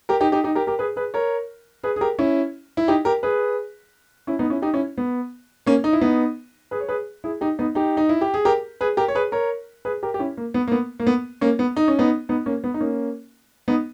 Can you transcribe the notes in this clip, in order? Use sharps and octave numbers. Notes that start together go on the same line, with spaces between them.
G4 A#4
D#4 G4
D#4 G4
D#4 G4
G4 A#4
G4 A#4
G#4 B4
G#4 B4
A#4 C#5
G#4 B4
G#4
G4 A#4
C#4 E4
E4
D#4 G4
G4 A#4
G#4 B4
C#4 E4
B3 D#4
C#4 E4
D#4 G4
C#4 E4
B3
A#3 C#4
D#4
E4
B3 D#4
G#4 B4
C#5
G#4 B4
E4 G#4
D#4 G4
B3 D#4
D#4 G4
D#4
E4
G4
G#4
G4 A#4
G#4 B4
G4 A#4
C#5
G#4 B4
A#4 C#5
G#4 B4
G4 A#4
G4
C#4 E4
A#3
B3
A#3
B3
A#3
B3
A#3 C#4
B3
D#4
C#4
B3 D#4
B3 D#4
A#3 C#4
B3
D#4
A#3 C#4
B3 D#4